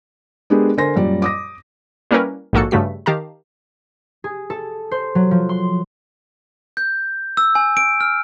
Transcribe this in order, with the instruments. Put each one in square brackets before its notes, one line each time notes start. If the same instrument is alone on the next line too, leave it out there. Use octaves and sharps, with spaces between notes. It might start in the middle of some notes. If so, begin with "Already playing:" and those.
[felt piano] G#3 B3 D4 G4 G#4 A#4
D3 A#4 C5 G#5 C6 A#6
F#2 A#2 G3 D5
D6 D#6 A#6
[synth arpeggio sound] G3 A#3 C#4 E4 A#4 B4
A#1 G#2 A#3 F#4 A4 C#7
G2 C#3 A3 F#4 B6
D#3 G4 F5 A5 A#5
[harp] G#4
A4
C5
F#3
F3
C6
[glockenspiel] G6
E6
G#5
D7
F6